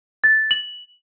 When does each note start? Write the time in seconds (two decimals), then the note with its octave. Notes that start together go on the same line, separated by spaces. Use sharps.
0.24 A6
0.51 F#7